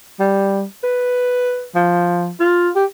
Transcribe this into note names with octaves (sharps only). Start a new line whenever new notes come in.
G3
B4
F3
F4
G4